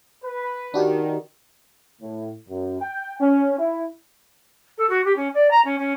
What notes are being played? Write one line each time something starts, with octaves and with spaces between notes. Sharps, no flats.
B4
D#3 D4 F#4 G4
A2
F#2
G5
C#4
E4
A4
F#4
G4
C#4
D5
A#5
C#4
C#4